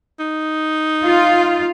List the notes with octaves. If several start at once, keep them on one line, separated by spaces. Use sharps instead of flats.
D#4
F4